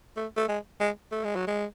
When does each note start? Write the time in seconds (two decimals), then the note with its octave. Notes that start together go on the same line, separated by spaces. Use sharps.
0.17 A3
0.37 A3
0.48 G#3
0.80 G#3
1.12 A3
1.24 G#3
1.36 F#3
1.47 G#3